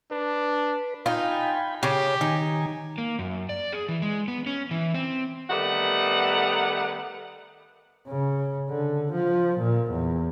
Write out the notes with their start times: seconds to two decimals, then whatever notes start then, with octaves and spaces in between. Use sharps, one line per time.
0.11 D4 B4
1.06 D#4 F4 G5 G#5 B5
1.83 C#3 G4 C#5
2.21 D#3 D#4 G#5
2.98 A#3
3.19 F#2
3.49 D5
3.72 G#4
3.89 E3
4.02 G#3
4.28 B3
4.46 C#4
4.71 E3
4.94 C4
5.49 D#3 G3 A3 B3 F#5
8.08 C#3
8.70 D3
9.12 F3
9.59 A#2
9.90 E2